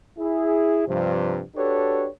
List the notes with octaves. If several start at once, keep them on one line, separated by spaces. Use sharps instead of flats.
E4 G#4
G2 C3 F3
D4 F#4 G4 A4 B4 C#5